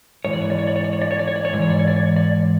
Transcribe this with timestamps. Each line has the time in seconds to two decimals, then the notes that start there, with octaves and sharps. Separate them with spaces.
0.25 G#2 E3 C#5
0.33 D5
0.42 C#5
0.50 D5
0.59 C#5
0.67 D5
0.76 C#5
0.85 D5
0.93 C#5
1.02 D5
1.11 C#5
1.19 D5
1.28 C#5
1.36 D5
1.45 C#5
1.53 G#2 E3 D5
1.62 C#5
1.70 D5
1.79 C#5
1.88 D5
1.96 C#5
2.16 D5